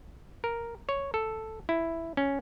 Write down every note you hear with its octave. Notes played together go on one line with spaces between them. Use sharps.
A#4
C#5
A4
E4
C#4